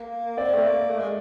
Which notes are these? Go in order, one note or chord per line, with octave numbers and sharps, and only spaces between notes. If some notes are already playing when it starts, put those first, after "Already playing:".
Already playing: A#3
C4 D5
A3
A#3
A3
G#3